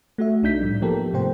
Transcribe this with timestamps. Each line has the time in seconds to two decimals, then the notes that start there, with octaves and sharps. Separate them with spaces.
0.18 A3 F#4 E5
0.43 C2 D4 D#4 G6 B6
0.61 A2 F3 G3
0.82 F3 A#3 B3 G4 A4 A#4
1.13 G#2 C3 A3 B3 C5 G5